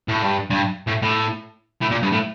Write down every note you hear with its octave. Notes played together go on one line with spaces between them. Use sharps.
A2
G2
G2
A2
A2
A2
A#2
G2
A2